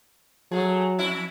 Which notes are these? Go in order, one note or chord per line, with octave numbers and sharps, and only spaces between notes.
F#3 A3 G#4
F2 E4